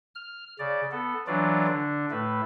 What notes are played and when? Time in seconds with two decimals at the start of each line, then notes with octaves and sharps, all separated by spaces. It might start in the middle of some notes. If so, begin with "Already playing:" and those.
0.15 F6
0.59 C#3 D5
0.92 B3 A4
1.27 E3 F#3 D4 F4 D5
1.67 D3 D4
2.11 A2 A3 B4